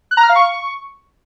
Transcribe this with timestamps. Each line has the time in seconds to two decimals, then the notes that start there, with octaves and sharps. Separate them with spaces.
0.11 F#6
0.17 A#5
0.23 F6
0.29 F5
0.35 C#6